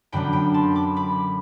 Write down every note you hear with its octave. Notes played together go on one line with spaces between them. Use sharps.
F#2 D3 F#3 B3 D4 G5 B5
G5 B5
A5 C6
B5 D6
B5 D6